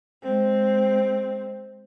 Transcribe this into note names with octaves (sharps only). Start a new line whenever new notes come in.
G#3 C4